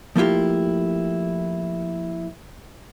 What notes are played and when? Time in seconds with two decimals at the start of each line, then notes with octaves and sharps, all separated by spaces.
0.16 F3 A3 A#3 E4 F4 G4